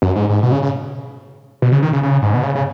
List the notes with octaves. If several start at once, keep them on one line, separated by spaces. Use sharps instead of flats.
F#2
G#2
G#2
B2
C#3
C#3
B2
C#3
D#3
C#3
C#3
G#2
B2
C#3
C#3